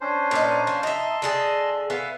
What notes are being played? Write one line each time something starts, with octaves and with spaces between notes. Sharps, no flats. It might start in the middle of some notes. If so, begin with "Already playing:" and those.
C#4 D4 C5
A#2 D#4
F3
D#4 D#5 E5 A5 C6
D3 G#4 A4
B3 E5 F5